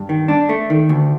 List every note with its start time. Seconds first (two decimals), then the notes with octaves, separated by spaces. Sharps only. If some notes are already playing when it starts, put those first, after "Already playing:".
Already playing: G2
0.09 D#3
0.28 D4
0.49 A3
0.70 D#3
0.89 D2